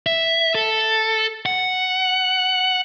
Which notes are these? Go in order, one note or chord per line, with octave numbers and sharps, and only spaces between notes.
E5
A4
F#5